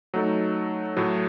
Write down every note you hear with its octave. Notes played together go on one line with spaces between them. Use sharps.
F#3 A3 D#4 A4
A2 F#3 A3